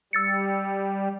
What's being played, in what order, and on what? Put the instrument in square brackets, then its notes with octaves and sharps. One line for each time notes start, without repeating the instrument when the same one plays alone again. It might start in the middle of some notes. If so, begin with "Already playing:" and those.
[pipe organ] G3 [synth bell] E6 A6 C#7